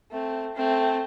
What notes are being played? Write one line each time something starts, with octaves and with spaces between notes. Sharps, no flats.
A3 C4
A3 C4